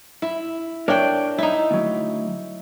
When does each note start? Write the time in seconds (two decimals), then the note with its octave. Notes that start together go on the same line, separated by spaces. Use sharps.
0.22 E4
0.88 D4 A#4 C#5 E5 G5
1.38 D#4 E4
1.71 D2 F#3